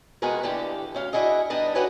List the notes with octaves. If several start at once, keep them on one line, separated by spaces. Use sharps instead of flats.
C3 G#3 B3 F#4 G#4 A#4
D3 E3 A#3 G4
D2 C#4 F5
D4 E4 F#4 G#4 D#5
G3 B3 D4 D#4 D#5
F#4 G4 B4 C#5 F#5 G#5